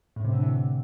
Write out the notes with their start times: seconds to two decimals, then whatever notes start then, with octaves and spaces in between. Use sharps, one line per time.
0.16 A2
0.25 C3
0.33 D3
0.42 C3 E3